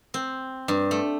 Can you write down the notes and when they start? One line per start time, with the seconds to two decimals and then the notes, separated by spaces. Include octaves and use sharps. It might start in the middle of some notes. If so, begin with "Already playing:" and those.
0.14 C4
0.68 G2
0.91 A3